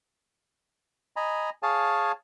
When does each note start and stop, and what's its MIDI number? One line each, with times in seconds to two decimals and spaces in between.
1.16 1.50 75
1.16 1.50 80
1.16 1.50 82
1.16 1.50 83
1.63 2.12 68
1.63 2.12 73
1.63 2.12 77
1.63 2.12 80
1.63 2.12 81